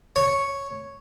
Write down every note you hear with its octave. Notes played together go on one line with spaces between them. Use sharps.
C#5